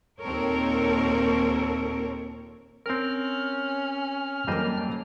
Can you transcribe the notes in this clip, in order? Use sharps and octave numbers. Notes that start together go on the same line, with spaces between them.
D#2 A#2 C4 A4 A#4 C#5
C4 C#4 A#4 F6
F2 F#3 G3 A#3 C5 D#5